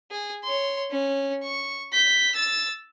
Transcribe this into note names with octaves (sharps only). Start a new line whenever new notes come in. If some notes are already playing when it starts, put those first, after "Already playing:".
G#4
C#5 C6
C#4
C#6
G6 B6
E6 A6